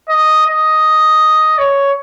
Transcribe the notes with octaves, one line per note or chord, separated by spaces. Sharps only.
D#5
D#5
C#5